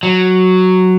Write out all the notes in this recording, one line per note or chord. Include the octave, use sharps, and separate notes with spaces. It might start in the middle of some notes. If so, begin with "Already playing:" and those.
F#3